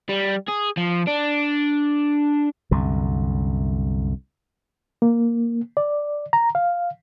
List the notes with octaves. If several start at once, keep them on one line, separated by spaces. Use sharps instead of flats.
G3
G#4
F3
D4
C2 F#2 D3
A#3
D5
A#5
F5